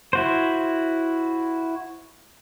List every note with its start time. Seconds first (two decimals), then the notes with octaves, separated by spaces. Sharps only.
0.13 E4 F#4 C5